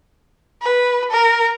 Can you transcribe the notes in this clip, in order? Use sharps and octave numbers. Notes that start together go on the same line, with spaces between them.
B4
A#4